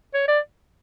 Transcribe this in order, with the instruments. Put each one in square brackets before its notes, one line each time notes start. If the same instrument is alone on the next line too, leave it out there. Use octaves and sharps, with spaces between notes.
[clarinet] C#5
D5